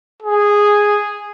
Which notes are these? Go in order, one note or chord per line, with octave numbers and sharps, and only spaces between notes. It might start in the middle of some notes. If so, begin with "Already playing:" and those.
G#4